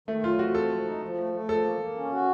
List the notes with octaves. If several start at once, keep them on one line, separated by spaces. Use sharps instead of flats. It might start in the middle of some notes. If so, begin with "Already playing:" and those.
D#3 A3
F#3 F4
C4 F#4
C4 A4
F3
D#4
F3
A3
A3
F3 A4
A#3
A#3
C#4
F#4